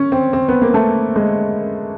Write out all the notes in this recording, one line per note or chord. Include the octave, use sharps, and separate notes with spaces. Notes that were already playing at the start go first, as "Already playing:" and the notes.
Already playing: C#4
C4
C4
B3
A#3
A3
G#3